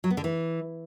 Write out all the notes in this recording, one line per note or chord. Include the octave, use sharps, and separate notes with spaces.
F#3
B3
D3
E3